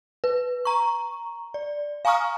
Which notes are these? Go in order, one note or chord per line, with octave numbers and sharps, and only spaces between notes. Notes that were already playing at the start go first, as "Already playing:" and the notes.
B4
A#5 C#6
D5
F5 G#5 A#5 C#6 D#6 F6